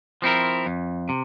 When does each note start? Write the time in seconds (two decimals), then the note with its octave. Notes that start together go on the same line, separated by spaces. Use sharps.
0.22 F3 C4 E4 A#4
0.66 F2
1.09 C3